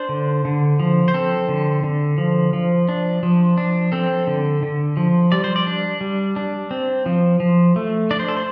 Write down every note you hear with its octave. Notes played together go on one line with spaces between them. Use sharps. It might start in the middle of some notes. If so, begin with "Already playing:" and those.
Already playing: D4 C5
D3
D3
F3
C5
C4 A4
D3
D3
F3
F3
D4
F3
D4
C4 A4
D3
D3
F3
G3 D5
C5
D5
D4
G3
D4
C4
F3
F3
A3
D4 D5
C5
A4
C5